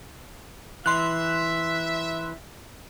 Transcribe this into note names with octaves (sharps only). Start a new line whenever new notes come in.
E3 E5 C6 F#6